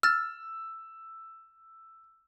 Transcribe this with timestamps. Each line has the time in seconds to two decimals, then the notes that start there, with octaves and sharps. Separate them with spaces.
0.03 E6 F6 A6